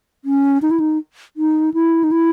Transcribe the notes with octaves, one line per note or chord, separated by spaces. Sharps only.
C#4
D#4
E4
D#4
D#4
E4
D#4
E4